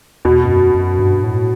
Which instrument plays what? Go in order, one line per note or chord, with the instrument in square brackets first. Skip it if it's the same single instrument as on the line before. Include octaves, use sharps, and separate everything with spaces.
[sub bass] E2 [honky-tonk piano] B2
[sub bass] G2
F#2
F#2
G2
A2